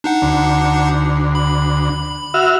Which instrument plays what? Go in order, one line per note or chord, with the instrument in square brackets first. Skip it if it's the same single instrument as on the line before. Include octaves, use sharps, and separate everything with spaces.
[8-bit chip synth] D4 D#4 F#5
[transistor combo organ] D2
[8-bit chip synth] B5
[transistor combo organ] F#4 E5 F6